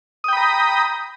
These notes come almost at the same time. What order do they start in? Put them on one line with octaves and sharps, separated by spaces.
D#6 G5 B5 A#5